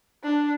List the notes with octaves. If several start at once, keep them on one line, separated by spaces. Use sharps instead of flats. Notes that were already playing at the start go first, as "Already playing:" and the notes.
D4